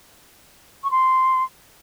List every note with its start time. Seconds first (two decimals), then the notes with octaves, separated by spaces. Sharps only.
0.83 C#6
0.90 C6